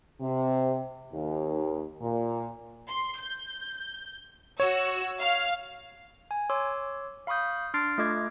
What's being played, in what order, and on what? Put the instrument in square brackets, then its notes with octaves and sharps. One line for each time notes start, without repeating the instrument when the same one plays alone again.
[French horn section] C3
D#2
A#2
[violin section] C6
G6
[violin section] F#4 E6 [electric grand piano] C#5
[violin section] F5 F6
[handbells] G#5
C#5 C6 D6 E6
F5 B5 C#6 D#6 G6
D4 C6 F6 A6 C7 D7
A3 F4 A4 D#5 D6 G#6